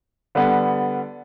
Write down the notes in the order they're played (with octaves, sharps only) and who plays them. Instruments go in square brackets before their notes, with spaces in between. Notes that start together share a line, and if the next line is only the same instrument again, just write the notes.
[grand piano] D3 G3 B3